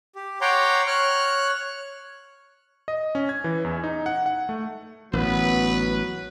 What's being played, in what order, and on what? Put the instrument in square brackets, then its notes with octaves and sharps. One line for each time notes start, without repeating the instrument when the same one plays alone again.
[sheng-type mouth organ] G4
C#5 F#5 G5 A#5 C6 D6
C#5 F6 F#6
[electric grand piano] D#5
C#4
G#6
E3
E2
D#4
F#5
F#5
A3
[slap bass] A1 [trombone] F#3 [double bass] B3 [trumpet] B4